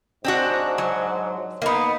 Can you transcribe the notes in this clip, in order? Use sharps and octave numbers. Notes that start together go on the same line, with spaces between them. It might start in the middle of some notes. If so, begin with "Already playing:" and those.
G#2 C4 D4 F#4
F#3
A#3 B3 D#4